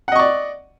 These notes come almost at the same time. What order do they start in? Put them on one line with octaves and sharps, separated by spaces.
F#5 D#5 C#6 D5